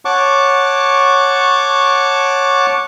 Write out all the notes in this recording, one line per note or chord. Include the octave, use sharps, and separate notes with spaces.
C#5 F#5 A5 C#6 D6